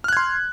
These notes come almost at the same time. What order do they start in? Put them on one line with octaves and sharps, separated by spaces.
F6 F#6 G#6 C6